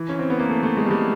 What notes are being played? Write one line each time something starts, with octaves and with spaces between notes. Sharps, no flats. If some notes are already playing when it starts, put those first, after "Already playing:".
Already playing: E3
C#4
C4
B3
A#3
A3
A3
G#3
G3
G#3